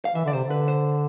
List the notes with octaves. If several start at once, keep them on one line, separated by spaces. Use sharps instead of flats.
F5
E3 E5
D3 D5
C3 C5
D3
B4
C5